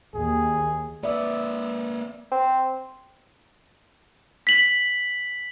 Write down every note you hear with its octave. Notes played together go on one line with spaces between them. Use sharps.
D#2 G#4
A#3 B4 D5 E5
C4
B6 F#7